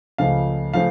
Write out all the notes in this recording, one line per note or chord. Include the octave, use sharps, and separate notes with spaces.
C#2 C#3 F3 A3 F5
C#3 F3 A3 F5